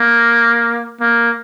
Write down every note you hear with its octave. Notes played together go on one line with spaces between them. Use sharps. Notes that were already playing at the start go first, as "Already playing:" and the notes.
Already playing: A#3
A#3